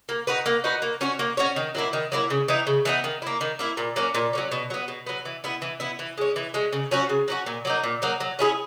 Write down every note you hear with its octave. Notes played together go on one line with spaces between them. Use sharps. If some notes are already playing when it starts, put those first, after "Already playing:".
A#3
D#4 F#4 B4
A#3
D#4 F#4 B4
A#3
C#4 F#4 C#5
A#3
C#4 F#4 C#5
D#3
F#3 A#3 E4
D#3
F#3 A#3 E4
C#3
E3 B3 D#4
C#3
E3 B3 D#4
D#3
A#3 E4
D#3
A#3 E4
A#2
F#3 A#3 C#4
A#2
F#3 A#3 C#4
B2
F#3 B3
B2
F#3 B3
E3
B3 E4
E3
B3 E4
E3
G#3 C#4
E3
G#3 C#4
C#3
F#3 C#4 F#4
C#3
F#3 C#4 F#4
A#2
F#3 A#3 D#4
A#2
F#3 A#3 D#4
F#3
C#4 E4 G#4